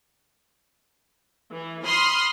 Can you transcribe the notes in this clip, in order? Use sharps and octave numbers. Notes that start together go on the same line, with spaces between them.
E3
B5 C6 D#6 F6 C7